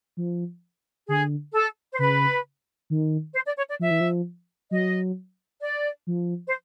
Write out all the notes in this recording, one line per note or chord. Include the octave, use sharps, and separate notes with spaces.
F3
D3 G#4
A4
C5
C#3 B4
D#3
C5
D5
C#5
D5
F3 E5
E3
F3
F#3 D#5
D5
F3
C5